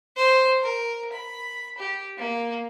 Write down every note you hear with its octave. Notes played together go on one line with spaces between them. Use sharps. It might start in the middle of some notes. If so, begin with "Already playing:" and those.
C5
A#4
B5
G4
A#3